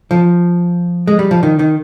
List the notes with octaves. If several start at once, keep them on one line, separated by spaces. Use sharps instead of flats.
F3
G#3
G3
F3
D#3
D#3